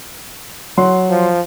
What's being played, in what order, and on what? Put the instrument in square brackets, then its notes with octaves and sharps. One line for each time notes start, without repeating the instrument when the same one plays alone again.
[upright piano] F#3 F#5 C6
[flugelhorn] F3